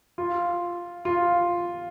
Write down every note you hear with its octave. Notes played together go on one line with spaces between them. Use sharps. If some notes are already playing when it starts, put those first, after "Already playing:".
F4
F4